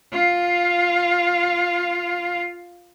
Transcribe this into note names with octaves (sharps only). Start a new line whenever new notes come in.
F4 F5